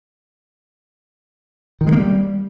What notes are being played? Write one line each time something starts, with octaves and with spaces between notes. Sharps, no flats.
D#3
G#3
A#3
G3